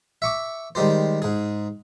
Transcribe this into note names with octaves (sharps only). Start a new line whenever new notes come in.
E5 C#6 D6
D#3 G3 G#3 G4 C5
G#2 G#4